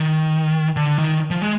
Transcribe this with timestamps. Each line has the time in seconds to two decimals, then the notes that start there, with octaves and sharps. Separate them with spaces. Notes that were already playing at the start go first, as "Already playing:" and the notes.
Already playing: D#3
0.76 D3
0.98 D#3
1.31 F3
1.42 G#3